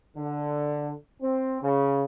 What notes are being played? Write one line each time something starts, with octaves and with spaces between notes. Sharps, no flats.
D3
C4
C#3